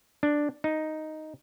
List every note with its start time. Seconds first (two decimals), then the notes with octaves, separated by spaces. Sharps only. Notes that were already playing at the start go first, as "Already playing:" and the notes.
0.23 D4
0.64 D#4